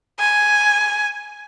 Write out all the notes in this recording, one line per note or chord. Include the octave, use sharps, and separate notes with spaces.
G#5